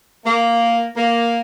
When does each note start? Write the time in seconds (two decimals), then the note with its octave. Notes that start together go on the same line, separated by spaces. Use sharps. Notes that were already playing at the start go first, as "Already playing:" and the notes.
0.25 A#3
0.96 A#3